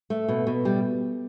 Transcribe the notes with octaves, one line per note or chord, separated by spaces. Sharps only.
A3
B2
B2
G3